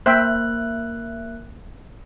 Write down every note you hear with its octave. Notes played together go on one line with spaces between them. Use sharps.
A#3 C5 E5 G5 F#6